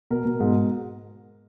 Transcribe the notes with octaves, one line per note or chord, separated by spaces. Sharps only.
B2 A#4
B2
G#2